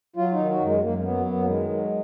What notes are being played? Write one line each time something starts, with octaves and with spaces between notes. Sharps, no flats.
F#3 F4
D#4
D#3
F#4
F#2
G#3
F#2 A#3
A#3
F#3 B3
F#2 B3
A#3
D#3 G#3
F#3